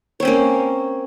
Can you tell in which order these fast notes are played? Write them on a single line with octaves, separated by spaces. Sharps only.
C#5 C4 C#4 A#3